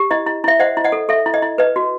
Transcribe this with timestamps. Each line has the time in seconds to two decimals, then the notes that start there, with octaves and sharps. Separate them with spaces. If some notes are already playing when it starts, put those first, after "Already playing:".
Already playing: G4
0.11 E4 D#5
0.27 E4
0.44 E4 E5
0.60 C5 D#5 F#5
0.77 E4
0.84 D#5 F#5
0.92 A4
1.09 A4 E5
1.26 E4
1.34 D#5
1.42 E4
1.58 B4 D#5
1.76 F#4